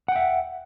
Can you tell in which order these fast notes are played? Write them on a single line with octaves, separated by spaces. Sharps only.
F#5 G5 E5